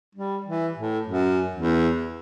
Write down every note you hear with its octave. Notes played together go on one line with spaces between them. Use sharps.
G3
E3
A2
F#2
E2